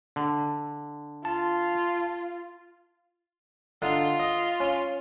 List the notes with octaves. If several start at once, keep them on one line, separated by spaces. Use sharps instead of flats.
D3
F4 A5
D3 D#4 F4
D#5
C#4